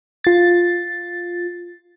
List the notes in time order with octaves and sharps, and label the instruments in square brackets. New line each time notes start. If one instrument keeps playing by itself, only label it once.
[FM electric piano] F4 A6